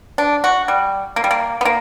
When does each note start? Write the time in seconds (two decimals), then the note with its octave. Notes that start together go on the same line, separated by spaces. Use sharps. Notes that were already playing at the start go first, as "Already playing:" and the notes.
0.18 D4
0.44 F#4
0.68 G3
1.16 A#3
1.24 G3
1.31 A#3
1.61 B3
1.65 A#3